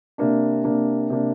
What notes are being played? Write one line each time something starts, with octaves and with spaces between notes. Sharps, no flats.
C3 A#3 D4
C3 A#3 D4
C3 A#3 D4